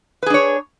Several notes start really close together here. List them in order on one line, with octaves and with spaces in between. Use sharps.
B4 G#4 D4 C#5